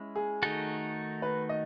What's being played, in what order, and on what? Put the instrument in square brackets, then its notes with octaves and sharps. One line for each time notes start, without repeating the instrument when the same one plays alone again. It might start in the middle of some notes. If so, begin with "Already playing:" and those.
Already playing: [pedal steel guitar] G#3 C#4 E4
[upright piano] G#4
[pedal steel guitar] D#3 A3 D#4 F#4 A4
[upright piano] B4
D#5